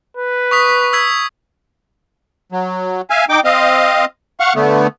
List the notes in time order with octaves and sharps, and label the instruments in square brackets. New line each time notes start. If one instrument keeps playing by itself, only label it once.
[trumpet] B4
[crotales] C#6 D#6 B6
E6 G#6 B6
[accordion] F#3
E5 F5 G#5
D#4 G5 D6
C4 D#5 F5
F5 F#5 C#6
D3 A3 B3